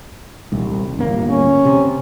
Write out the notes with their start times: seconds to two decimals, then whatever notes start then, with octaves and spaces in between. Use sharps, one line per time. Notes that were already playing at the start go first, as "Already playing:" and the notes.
0.52 D#1 C2
0.97 D1 G1 A#3
1.30 C#4
1.65 C3